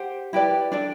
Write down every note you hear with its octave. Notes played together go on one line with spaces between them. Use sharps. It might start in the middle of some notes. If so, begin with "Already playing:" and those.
Already playing: G4 C5 F#5
E4 G4 B4 D5
D4 A4 D5